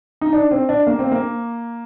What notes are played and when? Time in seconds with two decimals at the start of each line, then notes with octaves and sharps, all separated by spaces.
0.21 D#4
0.33 D4
0.51 C4
0.69 D4
0.87 A#3
0.99 C4
1.11 A#3